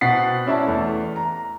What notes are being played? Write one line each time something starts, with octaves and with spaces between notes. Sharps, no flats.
B2 C4 F#5 A6 B6 C7
C#4 E4 D5 E5 A5
E2 A3
A#5